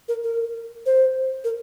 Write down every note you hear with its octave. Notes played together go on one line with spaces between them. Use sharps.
A#4
A#4
C5
A#4